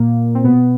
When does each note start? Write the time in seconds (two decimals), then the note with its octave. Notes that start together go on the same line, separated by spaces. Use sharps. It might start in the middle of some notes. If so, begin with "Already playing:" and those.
Already playing: A#2 A#3
0.35 C4
0.44 B2 B3